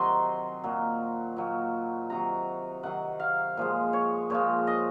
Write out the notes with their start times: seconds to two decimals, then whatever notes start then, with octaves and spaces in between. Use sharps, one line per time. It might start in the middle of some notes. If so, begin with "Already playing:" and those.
Already playing: C3 D#3 F#3 G#5 C6
0.64 A#2 F#3
1.37 A#2 F#3
2.10 C3 D#3 F#3 A#5
2.83 C3 D#3 F#3 F#5
3.20 F5
3.57 A#2 F3 G#3
3.93 C#5
4.30 A#2 F3 G#3 C#5
4.67 D#5